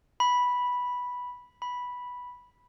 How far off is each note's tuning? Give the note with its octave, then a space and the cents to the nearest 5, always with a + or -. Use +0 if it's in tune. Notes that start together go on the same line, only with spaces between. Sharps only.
B5 -5
B5 -5